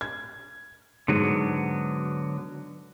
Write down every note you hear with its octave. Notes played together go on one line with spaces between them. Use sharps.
G#6
G#2 D3 F#3 B3